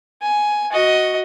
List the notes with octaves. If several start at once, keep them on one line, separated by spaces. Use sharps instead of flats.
G#5
F#4 D#5